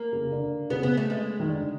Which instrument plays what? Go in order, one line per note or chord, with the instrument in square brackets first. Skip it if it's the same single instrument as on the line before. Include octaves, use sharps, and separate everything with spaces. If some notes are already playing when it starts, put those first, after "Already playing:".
Already playing: [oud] A#3
[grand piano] C#3
D3
[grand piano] C#3 [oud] B3
[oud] B3
A3
G#3
[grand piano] D#3
D3